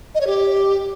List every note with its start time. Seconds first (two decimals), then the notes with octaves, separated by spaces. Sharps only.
0.15 D#5
0.21 C#5
0.27 G4